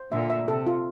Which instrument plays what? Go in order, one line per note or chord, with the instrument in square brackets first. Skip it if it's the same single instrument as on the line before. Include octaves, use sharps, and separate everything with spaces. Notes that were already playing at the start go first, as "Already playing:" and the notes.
Already playing: [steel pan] C5
[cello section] A#2 D3 [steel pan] E5
[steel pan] E5
[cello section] C3 [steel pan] A4
[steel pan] F4